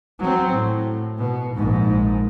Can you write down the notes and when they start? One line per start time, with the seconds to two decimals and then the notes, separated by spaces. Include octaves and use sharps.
0.19 F#3 C4
0.53 A2
1.17 B2
1.54 A#1 G#2